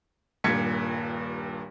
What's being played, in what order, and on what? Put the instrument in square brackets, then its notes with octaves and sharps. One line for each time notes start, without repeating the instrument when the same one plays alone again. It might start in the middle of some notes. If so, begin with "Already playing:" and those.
[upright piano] D#1 G2 A#2 G#6 B6 C#7